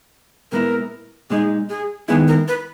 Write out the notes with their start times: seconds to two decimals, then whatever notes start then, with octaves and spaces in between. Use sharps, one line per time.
0.52 A#2 G#3 B3 E4 A#4
1.30 A#2 G#3 D#4 G#4
1.70 G#4
2.08 D#3 G#3 B3 E4 G#4
2.28 A#4
2.48 B4